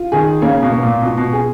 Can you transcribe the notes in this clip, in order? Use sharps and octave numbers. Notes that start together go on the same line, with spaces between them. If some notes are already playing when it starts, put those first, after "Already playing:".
Already playing: F4
D#3 G#4
C#3 A#3
B2
A#3
A#2
B2 F4
B2
G#4